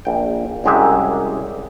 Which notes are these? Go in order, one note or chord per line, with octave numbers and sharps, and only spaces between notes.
A#1 G5
C2 F#2 G#3 G4 G#4 E5